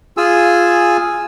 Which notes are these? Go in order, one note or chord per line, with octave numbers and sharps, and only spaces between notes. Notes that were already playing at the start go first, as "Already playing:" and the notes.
F4 G#4 G#5 E6